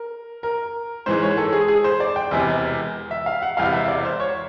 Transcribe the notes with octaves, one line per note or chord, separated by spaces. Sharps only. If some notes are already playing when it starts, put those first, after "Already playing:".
Already playing: A#4
A#4
G#2 E3 G#3 C5
C#5
A4
G#4
G#4
C5
D5
G5
E1 E2 C3 G#5
E5
F5
F#5
E1 E2 C3 F5
E5
D5
C5
C#5